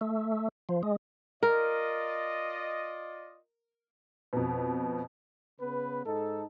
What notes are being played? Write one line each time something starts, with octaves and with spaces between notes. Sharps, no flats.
A3
F3
G#3
F4 A#4 D5 D#5
F2 B2
C#3 B3 B4
G#2 D#4 A4